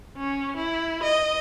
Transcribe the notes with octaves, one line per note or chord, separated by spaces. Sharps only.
C#4
E4
D#5